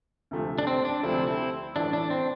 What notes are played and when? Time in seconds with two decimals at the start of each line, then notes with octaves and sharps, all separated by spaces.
0.31 D2 C3 F3 A3
0.58 D4
0.67 C4
0.85 D4
1.03 D2 C3 F3 A3 C4 E4
1.27 C4 E4
1.76 A1 A2 E3 A3 D4 E4
1.93 D4
2.10 C4